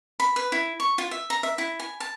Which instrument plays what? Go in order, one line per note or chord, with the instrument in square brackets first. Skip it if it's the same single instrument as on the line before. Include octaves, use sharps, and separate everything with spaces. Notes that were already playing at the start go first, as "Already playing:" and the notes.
[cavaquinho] B5
B4
E4
C#6
F4
E5
A#5
E5
E4
G#5
A5